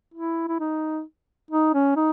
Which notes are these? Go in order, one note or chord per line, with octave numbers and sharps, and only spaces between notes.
E4
E4
D#4
D#4
C#4
D#4